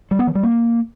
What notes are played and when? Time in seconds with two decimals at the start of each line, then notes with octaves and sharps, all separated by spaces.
0.11 G3
0.19 B3
0.27 E3
0.35 G3
0.43 A#3